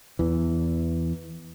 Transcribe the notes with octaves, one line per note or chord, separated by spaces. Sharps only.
E2 E3